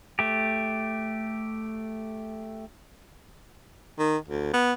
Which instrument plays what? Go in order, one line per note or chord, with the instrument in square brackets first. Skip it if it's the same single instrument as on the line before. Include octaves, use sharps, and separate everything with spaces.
[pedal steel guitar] A3 G4
[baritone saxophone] D#3
D2
B3